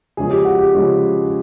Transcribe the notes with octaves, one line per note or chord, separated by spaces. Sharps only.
C#3 F3 G#3 C#4 G#4
G4
F#4
G4
C#3 F3 G#3 C#4